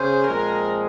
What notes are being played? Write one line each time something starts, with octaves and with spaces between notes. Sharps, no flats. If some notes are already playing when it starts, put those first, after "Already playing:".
Already playing: C#3 C#4 G#4 C5
A#2 F3 G#3 C4 A#4